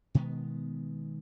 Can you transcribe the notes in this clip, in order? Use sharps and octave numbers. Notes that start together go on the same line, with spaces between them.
B2 D#3 G#3 B3